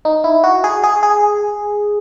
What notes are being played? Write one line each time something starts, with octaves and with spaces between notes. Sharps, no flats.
D#4
E4
F#4
G#4
G#4
G#4